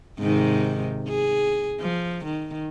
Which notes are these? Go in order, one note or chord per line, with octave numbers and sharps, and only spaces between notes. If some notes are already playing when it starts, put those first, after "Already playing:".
G#2 C3 D#3
G#4
F3
D#3